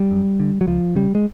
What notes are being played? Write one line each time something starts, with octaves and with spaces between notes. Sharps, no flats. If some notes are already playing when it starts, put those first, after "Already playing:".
Already playing: G3
F#2
D3
F#3
C#2 F3
C#3 G3
G#3